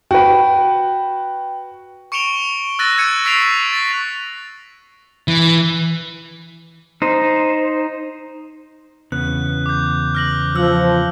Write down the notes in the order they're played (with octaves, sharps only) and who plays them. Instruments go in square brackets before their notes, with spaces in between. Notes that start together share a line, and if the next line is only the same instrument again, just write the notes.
[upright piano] F#4 B4 [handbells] G5
[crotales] C#6 C#7 D7 E7 F7 G7
E6 F#6 A6 A#6 D#7
F#6 G#6 C#7 D#7
C#6 E6 B6 C7 D7 F7
A6 B6
[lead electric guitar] E3
[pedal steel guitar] D#4 C5
[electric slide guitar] E2 C#3 B3 [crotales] F#6
[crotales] D6 G6
F6 A#6 F#7
[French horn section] F3 [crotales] E6 G6 F#7